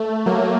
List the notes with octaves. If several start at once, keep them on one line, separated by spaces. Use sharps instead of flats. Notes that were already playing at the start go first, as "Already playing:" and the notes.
Already playing: A3
F#3 A#3